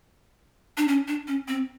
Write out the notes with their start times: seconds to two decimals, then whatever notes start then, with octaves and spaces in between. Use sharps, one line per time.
0.78 D4
0.88 C#4
1.08 D4
1.28 C#4
1.48 C4